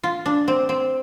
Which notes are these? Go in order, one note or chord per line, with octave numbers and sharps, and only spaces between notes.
F4
D4
C4
C4